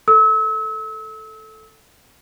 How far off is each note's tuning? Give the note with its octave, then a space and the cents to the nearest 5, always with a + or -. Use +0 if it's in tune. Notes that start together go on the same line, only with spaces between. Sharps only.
A4 +0 E6 -35